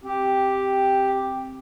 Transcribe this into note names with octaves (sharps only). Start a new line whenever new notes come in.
C4 G4